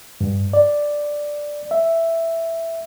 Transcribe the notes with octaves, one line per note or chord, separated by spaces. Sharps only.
G2
D5
E5